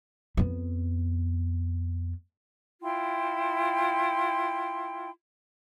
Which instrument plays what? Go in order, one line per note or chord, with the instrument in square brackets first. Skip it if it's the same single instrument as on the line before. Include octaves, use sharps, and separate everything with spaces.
[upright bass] F2 B3
[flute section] E4 F4 G5 C6